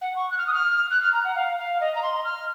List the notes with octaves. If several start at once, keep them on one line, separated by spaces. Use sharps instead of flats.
F#5
C#6
F#6
F6
D#6
F6
F#6
F6
A#5
F#5
F5
F5
D#5
A#5
C6
F6